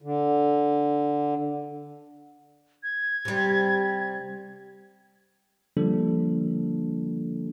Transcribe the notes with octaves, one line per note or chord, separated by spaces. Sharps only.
D3
G#6
C3 G3
D3 F3 G3 A#3 D4 A4